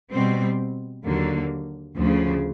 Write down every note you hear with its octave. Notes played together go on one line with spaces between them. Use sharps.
B2 G3 C4
D#2 D3 F#3 A#3
D2 C#3 F3